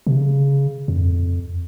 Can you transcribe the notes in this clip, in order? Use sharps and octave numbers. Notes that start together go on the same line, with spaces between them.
C3
C#3
F2